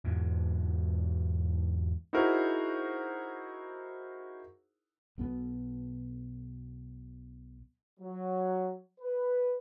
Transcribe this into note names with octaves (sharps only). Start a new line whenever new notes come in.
E2 G#2 B2
D#4 E4 F#4 G#4 A#4 C5
B1 B2 D3 B3
F#3
B4